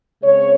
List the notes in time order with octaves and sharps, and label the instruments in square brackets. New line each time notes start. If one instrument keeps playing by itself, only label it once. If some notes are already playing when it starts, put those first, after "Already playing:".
[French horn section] C#3 G#3 C4 C#5